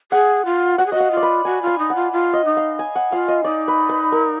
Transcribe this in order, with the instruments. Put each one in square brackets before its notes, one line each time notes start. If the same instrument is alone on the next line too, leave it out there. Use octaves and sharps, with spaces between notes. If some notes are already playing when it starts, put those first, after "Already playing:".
[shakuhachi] G#4 [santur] F#5
[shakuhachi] F4
[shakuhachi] F#4 [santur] F#5
[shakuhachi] G#4
[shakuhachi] F#4 [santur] D#5
[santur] F5
[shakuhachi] F4
[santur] D5
B4
[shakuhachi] F#4 [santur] G#5
[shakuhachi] F4
[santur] G#5
[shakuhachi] D#4
[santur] F#5
[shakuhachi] F4
F4
[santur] D#5
[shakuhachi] D#4
[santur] F5
G#5
F#5
[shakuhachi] F4 [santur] F5
[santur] D#5
[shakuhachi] D#4 [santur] D5
[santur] B4
B4
A#4